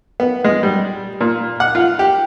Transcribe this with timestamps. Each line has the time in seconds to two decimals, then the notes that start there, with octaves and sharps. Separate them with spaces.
0.20 B3
0.44 G#3
0.63 G3
1.21 A#2
1.60 F#5
1.75 F4
1.99 G4